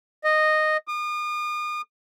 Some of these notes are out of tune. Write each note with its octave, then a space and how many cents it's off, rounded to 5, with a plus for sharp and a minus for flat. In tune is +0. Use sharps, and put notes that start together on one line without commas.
D#5 -10
D#6 -40